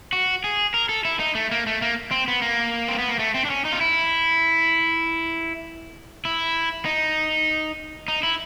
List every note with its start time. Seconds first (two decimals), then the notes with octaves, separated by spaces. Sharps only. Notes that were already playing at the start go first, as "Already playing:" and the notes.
0.13 F#4
0.44 G#4
0.74 A#4
0.89 A4
1.05 E4
1.20 D#4
1.35 A3
1.51 A#3
1.67 A3
1.82 A#3
2.11 C4
2.28 B3
2.42 A#3
2.88 C4
2.98 B3
3.09 A#3
3.19 A3
3.34 C4
3.45 D4
3.50 C#4
3.65 D#4
3.72 F4
3.81 E4
6.25 E4
6.85 D#4
8.08 D#4
8.23 E4